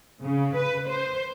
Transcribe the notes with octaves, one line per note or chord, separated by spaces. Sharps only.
C#3
B4
C5